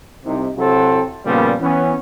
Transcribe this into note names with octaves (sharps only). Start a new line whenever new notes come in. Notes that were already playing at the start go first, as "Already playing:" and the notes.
C2 C3 D#4
C3 F#3 C4 E4 F#4 A4
A#2 C#3 F3 G3 A#3 B3
E3 B3 C#4